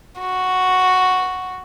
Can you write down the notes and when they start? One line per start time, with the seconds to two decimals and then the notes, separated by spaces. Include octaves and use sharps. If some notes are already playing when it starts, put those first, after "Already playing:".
0.20 F#4